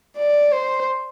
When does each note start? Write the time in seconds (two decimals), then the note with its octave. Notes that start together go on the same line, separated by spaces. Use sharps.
0.17 D5
0.52 C5